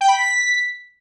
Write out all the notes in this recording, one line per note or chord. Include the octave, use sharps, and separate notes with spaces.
G5
B5
B6